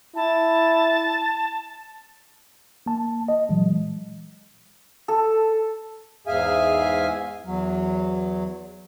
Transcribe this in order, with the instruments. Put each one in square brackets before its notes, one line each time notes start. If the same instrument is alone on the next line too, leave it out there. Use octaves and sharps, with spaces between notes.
[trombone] E4 [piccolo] A5
[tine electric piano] A#3 A5
D#5
A#2 E3 F#3 G#3
[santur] A4
[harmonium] E2 G#2 G#4 E5 F5 G#5
E2 F#3